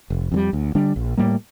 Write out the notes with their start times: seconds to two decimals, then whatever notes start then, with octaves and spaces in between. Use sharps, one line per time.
0.10 F1
0.32 F2 D3 G3
0.53 D2
0.75 D3 G3 D4
0.96 A#1
1.17 A2 G3 A#3